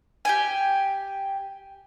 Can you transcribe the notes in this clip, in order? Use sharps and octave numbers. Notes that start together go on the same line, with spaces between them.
G4 G5 G#5